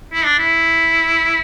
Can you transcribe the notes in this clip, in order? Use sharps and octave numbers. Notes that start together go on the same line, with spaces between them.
E4
D4
E4